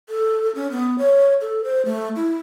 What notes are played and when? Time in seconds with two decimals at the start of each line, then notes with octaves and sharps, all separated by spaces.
0.09 A4
0.55 C#4
0.71 B3
0.98 C#5
1.41 A4
1.64 C5
1.85 A3
2.16 E4